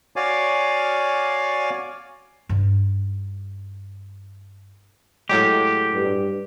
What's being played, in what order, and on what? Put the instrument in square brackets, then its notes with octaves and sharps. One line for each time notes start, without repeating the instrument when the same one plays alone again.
[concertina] F#4 C#5 D5 F5 G#5 D6
[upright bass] G2 D#4
[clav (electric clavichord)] A2 F#3 G#3 [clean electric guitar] G4
[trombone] G2